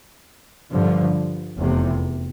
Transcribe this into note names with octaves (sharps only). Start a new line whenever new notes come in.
G2 D3 F3
F1 E2 C3